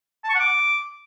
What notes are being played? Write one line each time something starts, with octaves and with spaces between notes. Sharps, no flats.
A5
C#6
F#5
D6